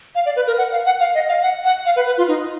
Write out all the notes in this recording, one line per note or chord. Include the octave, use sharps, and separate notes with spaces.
F5
D5
B4
A#4
F#5
F5
F#5
F5
D#5
F5
F#5
F#5
F5
B4
B4
F4
D#4